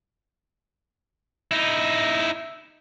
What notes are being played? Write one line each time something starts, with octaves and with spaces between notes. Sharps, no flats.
D#4 E4